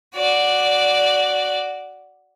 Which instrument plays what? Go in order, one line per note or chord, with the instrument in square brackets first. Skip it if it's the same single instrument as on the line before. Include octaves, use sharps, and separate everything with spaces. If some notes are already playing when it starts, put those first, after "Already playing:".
[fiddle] F#4 D5